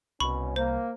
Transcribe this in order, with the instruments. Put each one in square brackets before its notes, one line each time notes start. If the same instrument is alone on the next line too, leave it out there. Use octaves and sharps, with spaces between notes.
[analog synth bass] C2 [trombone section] B2 C#4 [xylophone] B5 C#6
[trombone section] A#3 [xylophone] C5